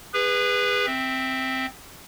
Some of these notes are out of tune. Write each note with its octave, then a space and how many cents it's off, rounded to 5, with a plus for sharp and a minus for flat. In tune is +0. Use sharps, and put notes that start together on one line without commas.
G#4 -30 B4 +0
C4 +0 E5 +0